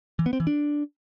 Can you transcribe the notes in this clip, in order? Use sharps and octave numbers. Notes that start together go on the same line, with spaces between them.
E3
B3
C4
E3
D4